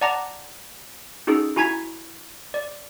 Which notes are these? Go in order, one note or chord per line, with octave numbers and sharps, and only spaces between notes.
D5 F#5 A5 A#5 D6 A#6
C#4 D#4 F#4 G#4 A4
E4 F#4 G#5 A#5 G#6 B6
D5